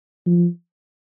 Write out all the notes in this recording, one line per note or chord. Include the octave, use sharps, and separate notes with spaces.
F3